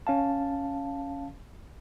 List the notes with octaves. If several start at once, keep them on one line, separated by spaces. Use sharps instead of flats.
C#4 F5 A5